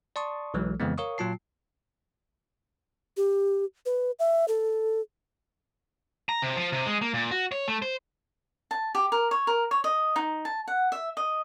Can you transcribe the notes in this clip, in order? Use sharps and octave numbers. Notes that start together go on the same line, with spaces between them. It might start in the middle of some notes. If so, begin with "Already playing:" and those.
D5 A5 C6 C#6 D#6
B1 E3 F#3 G#3
F2 C#3 E3 G#3 B3
A#4 C#5 F5 C#6 D#6
A#2 F#3 F4 A5 C7
G4
B4
E5
A4
A#5
C3
F3
C3
G#3
A#3
A#2
F#4
C#5
A3
C5
A5
G4
A#4
C#5
A#4
C#5
D#5
D#4
A5
F#5
E5
D#5